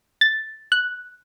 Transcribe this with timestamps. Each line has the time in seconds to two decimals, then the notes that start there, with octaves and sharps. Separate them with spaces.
0.21 A6
0.72 F#6